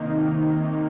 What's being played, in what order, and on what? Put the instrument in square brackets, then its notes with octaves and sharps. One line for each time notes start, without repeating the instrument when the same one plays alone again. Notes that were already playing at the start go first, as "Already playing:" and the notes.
Already playing: [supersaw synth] C3 D#3 A#3 D#4